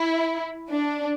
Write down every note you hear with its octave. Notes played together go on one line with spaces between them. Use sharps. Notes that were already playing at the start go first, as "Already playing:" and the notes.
Already playing: E4
D4